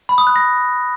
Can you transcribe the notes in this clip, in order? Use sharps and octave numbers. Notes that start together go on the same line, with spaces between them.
B5
D#6
F#6
A#6